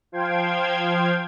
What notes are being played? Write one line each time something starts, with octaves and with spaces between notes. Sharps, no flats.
F3 C5 F5 G5 G#6